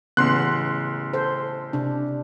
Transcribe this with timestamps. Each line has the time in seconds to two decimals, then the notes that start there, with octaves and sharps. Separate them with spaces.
0.17 A1 C#3 B3 C6 F#6
1.13 A4 C5
1.73 C3 D4